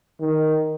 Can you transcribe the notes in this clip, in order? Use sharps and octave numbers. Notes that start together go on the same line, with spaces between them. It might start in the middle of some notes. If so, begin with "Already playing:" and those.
D#3